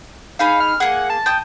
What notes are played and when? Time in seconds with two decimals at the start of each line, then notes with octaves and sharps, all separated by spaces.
0.39 D#4 G#4 F5 B5
0.60 F6
0.80 A#3 G#4 F#5
1.10 A5
1.26 G5 D#6